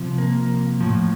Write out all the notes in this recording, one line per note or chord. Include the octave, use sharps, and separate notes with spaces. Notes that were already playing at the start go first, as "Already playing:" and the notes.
Already playing: C3 F3
A#3
A2 F3